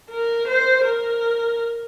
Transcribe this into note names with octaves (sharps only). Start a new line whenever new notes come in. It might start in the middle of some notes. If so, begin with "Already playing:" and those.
A#4
C5
A#4